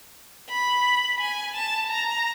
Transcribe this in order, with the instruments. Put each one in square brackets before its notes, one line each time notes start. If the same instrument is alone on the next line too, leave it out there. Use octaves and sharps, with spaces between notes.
[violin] B5
G#5
A5
A#5